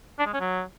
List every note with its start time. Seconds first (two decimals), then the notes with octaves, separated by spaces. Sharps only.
0.19 D4
0.26 G#3
0.33 C#4
0.41 F#3